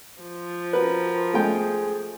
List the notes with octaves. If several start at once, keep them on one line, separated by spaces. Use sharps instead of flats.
F3
F#4 A#4 B4
G#3 A3 G#4 G5